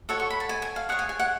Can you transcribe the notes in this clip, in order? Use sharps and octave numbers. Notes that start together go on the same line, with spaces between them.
F#4 A4 C#5 F#5
C#6
B5
A5
G#5
G#5
F5
G#4 C#5 F#5
G#5
G#5
F#5